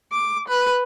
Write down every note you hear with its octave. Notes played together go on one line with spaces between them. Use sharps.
D6
B4